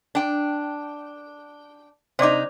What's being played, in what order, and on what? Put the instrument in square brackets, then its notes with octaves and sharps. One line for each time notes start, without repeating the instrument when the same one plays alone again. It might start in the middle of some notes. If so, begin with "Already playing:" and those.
[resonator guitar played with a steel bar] D4 G5
[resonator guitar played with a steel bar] C3 D#4 [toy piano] C5 D5 D6